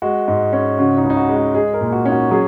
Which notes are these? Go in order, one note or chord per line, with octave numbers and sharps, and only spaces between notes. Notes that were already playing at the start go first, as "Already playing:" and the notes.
G#3 F#4
G#2
C#4
C#3 F#4
D#4
C#2
D#4
F#4
G#3
F#4
G#3 G#4
A#4
A#2
F#4
C#4 D#4
F#4
F#3 G#4